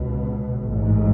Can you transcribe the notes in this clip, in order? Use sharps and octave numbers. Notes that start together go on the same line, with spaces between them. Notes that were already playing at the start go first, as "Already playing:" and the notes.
Already playing: C#2 B2
A1 G#2